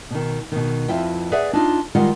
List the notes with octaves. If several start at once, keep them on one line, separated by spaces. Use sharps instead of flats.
B2 D#3
B2 D#3
F2 E4 F4 B4 G5
G#4 B4 D5 E5 F#5
D4 D#4 F4
D#3 G3 G#3 F4 F#5